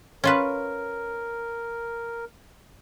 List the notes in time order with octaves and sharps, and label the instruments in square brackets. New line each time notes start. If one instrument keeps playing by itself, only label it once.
[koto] C#4 F4 B4 [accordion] A#4